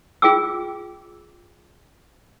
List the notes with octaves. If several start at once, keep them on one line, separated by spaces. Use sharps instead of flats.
F4 G#4 G5 D6 E6